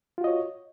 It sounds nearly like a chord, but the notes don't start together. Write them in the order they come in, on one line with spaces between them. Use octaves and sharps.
F4 F#4 D#5 C#5